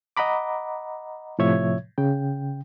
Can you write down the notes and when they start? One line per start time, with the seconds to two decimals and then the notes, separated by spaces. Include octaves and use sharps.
0.17 D#5 F#5 A#5 B5 D6
1.39 A2 C3 F3 C#5 E5 G#6
1.98 C#3 G5